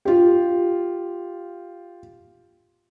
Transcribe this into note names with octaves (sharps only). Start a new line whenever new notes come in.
F4 G4